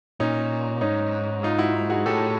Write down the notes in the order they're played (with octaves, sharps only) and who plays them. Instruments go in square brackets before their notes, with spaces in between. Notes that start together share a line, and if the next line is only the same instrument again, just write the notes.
[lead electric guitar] A#2 [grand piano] C#4 D#4
[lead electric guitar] G#2 [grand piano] C#4 D#4
[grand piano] D#4 F4
E4 F#4
F#4 G#4
[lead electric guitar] A2 [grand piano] G4 A4